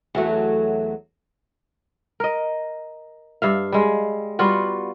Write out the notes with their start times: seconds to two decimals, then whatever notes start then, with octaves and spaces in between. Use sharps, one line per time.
0.15 E2 F#3 A3
2.20 A#4 D#5
3.42 G2 E5 F5
3.72 G3 G#3
4.39 G3 B3 F4 F#4